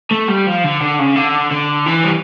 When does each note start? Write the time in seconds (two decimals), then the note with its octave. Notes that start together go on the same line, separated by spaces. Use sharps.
0.11 A3
0.28 G3
0.46 F3
0.64 D3
0.81 D3
0.99 C#3
1.16 D3
1.51 D3
1.86 E3
2.03 G3